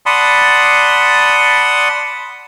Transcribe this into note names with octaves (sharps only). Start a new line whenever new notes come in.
D5 F#5 A5 B5 C6 D#6